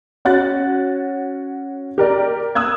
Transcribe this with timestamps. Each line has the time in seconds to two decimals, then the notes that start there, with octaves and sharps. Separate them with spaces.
0.25 C#4 F#4 F#6 A6
1.98 G4 A#4 D5
2.55 D#6 E6 F#6 G#6